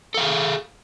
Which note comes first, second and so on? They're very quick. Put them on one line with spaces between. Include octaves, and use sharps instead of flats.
A4 F5 G#4